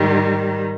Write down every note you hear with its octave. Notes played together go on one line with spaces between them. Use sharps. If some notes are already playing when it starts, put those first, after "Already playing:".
Already playing: G#2 D#3 G3